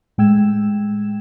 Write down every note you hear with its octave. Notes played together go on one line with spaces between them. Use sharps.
A2 G#3 G5 E6 G#6 E7